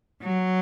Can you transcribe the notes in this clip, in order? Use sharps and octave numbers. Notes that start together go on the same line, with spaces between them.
F#3